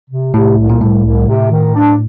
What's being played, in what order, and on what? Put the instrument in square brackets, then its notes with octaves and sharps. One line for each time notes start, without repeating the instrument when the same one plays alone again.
[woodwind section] C3
[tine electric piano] A2 [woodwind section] C3
[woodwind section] C2
[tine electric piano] A#2
[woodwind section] C2 [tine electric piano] A2
[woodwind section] C2
C3
D#3
D4